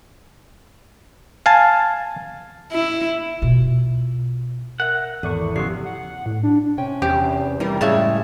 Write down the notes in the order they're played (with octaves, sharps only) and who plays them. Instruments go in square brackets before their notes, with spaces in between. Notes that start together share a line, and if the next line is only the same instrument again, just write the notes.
[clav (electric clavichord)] F5 G#5 A5
[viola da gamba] E4
[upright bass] B2 F4
[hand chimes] A#4 E5 [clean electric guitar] F#5
[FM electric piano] G#1 D5 C#6 [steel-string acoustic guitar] E2 [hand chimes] A4
[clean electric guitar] C#3 F3 F#3 [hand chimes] G4 C7
[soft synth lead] F#5
A2
D4
[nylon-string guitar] C3 C#4 G5
[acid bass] E2 [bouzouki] C4 [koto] G4
[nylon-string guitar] E3 D#4 E4 [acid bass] G3 [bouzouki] A#4
[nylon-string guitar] A2 E5 [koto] C#3 A5 [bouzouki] G#3 E4 C#5